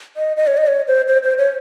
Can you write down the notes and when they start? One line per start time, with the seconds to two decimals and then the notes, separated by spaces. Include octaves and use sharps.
0.17 D#5
0.37 D#5
0.47 C#5
0.57 D#5
0.67 C#5
0.88 C5
1.08 C5
1.23 C5
1.38 C#5